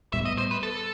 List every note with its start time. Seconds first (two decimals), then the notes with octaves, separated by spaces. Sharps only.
0.13 A2 G3 B3 E5
0.25 D#5
0.38 C5
0.51 B4
0.63 A4